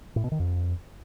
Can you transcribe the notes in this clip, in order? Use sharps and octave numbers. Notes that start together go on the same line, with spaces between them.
A2
B2
D#3
F2